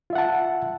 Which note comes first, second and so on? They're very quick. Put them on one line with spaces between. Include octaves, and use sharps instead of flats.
F4 E5 F#5 A5